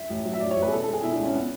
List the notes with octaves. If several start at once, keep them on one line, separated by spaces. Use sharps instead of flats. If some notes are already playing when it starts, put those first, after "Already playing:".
Already playing: E5
A1
F#3
E5
A1 D5
C#5
A1
B4
G#4
B2 A4
A4
G#3
G#4
B2 E4
D4
C#2
C#4
B3